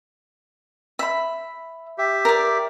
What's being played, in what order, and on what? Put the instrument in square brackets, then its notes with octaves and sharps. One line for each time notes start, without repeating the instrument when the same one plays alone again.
[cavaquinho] E5 B5
[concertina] G4 E5
[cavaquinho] A#4 D5